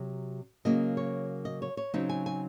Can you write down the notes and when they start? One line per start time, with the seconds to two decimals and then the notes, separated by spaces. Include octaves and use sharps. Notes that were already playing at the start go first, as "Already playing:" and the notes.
Already playing: C3 F#3
0.65 C#3 F#3 A#3 D#5
0.97 C#5
1.45 D#5
1.62 C#5
1.77 C#5
1.94 C#3 F#3 C4 D#4
2.09 G#5
2.26 G#5